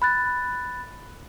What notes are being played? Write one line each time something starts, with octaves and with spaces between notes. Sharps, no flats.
B5 F#6 A6